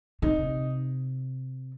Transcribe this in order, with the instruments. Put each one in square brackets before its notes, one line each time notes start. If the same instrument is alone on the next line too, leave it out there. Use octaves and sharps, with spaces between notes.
[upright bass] C3 [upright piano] D#4